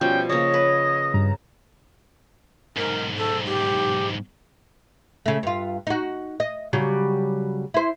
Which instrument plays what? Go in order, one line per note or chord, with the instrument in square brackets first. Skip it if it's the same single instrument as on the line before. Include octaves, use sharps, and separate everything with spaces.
[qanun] B2 F3 G3 [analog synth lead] C#4 [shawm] G5
[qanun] C#3 A#3 [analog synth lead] C#5 [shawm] D#5
[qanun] B4
[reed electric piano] G2 [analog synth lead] A#5
[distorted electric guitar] B1 G#2 [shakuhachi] A#4
[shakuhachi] A4
G4
[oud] C#3 A3
G2 F4
D#4 F#4
D#5
C#3 F#3 G3
E4 C5